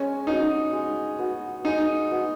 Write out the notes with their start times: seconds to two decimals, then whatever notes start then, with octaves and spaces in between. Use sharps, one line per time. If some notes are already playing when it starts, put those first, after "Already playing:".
Already playing: G#3 C#4
0.27 B3 D#4 F#4
0.73 G#3
1.18 B3 F#4
1.65 G#3 D#4
2.11 B3 F#4